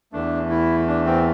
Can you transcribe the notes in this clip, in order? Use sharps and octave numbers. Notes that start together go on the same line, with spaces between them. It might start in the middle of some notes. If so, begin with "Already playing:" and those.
E2 E3 A3 D4
E4
D4
C4